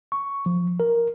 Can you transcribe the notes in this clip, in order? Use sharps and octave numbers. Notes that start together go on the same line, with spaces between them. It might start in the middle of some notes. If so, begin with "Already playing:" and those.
C#6
F3
A#4